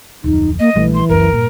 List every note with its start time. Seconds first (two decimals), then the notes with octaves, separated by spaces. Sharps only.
0.24 D1 F2 D#4
0.59 A#3 D#5
0.76 A#1 E3 G3 A3
0.94 C6
1.09 F#1 C#2 F#2 A#4
1.33 G2 A#2